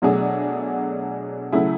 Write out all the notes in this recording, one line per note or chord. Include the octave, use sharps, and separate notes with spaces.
B2 F#3 A3 D4 G#4
C#3 F#3 A3 E4 G#4